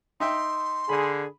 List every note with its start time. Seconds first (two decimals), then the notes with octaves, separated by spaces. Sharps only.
0.20 D#4 E5 G5 C6
0.89 D3 G#4 B5